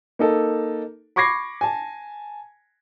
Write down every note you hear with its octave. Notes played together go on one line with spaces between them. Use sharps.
A#3 D#4 A4
B5 C#6 D6 G#6 A#6 C7
G#5 A5